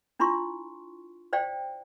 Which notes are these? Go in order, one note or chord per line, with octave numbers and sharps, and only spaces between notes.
D4 E4 F4 C6 C#6
C5 D5 F5 G5